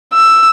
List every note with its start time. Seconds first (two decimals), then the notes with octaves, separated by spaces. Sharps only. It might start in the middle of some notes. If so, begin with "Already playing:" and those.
0.13 E6